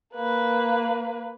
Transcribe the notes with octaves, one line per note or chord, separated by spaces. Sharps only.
A#3 B4